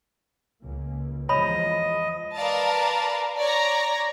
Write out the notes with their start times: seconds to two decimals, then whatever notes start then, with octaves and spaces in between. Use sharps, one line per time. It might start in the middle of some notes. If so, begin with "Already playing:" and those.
0.63 C#2 A#3
1.29 E2 F3 G#3 C#5 D#5 B5
2.36 A#4 B4 D5 F5 A5 A#5
3.38 C#5 D5 A#5